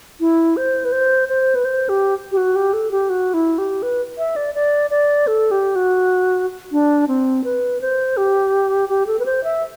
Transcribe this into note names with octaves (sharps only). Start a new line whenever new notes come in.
E4
C5
B4
C5
C5
B4
C5
G4
G4
F#4
G4
A4
G4
F#4
E4
G4
B4
E5
D5
D5
D5
A4
G4
F#4
D4
C4
B4
C5
G4
G4
A4
B4
C5
E5